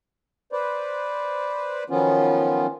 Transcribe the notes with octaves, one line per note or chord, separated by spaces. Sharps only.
B4 C5 D5
D#3 F3 F#3 B3 C#4 F4